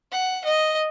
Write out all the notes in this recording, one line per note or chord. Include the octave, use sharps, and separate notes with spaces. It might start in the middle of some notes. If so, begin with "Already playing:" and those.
F#5
D#5